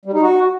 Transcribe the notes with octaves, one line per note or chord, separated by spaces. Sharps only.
G3
D#4
F#4